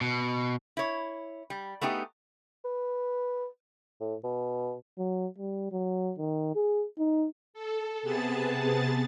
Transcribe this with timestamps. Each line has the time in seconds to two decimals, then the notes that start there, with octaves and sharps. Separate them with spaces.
0.01 B2
0.77 E4 C#5
1.50 G3
1.81 A3 B3 D#4 G4 G#4
2.65 B4
4.00 A2
4.24 B2
4.98 F#3
5.38 G3
5.72 F#3
6.18 D#3
6.55 G#4
6.98 D#4
7.54 A4
8.03 C3 B3 G#4 A5 A6